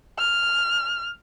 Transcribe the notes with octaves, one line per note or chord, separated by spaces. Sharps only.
F6